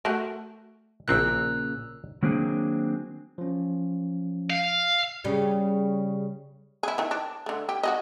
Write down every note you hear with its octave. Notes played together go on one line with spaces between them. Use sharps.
A3 F#4 A#4 A5
A#1 A#2 C#3 C4 E4 A#5 E6 F#6
D#3 F#3 A#3 C4 D4 G#4
F3 C#4
F5
C#3 G3
E4 G#4
D#3 E3
D4
D3 A3
G4
F#4 G#4 D#5